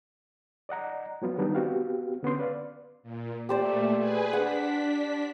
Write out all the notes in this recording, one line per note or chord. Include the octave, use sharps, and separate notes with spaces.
D5 D#5 F#5 A#5
F3 F#3 B3 F4
D#3 G3 B3 D4 D#4
B3 C4 F#4 G4 F5
D3 B3 C#4 C6
B4 D5 F5
A#2
A#2 A3 G4 C5 D5
G#4 B4 G#5
D4 F#5 B6